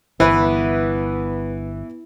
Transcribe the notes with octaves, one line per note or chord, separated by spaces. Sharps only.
G1 E3 B3 E4 B4